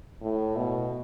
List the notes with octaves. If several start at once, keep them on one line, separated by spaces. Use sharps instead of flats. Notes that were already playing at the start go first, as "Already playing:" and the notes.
A2
B2